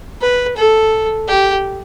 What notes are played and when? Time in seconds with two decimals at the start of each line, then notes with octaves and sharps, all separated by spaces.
0.21 B4
0.57 A4
1.28 G4